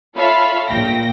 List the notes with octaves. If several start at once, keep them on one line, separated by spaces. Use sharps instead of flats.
F4 A4 C#5 E5 F5 B5
A#1 A#2 G5 A#6